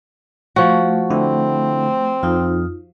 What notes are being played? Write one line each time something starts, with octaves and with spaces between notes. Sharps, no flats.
F3 A3 F#4
D3 C4 E4
F2 D#4 F4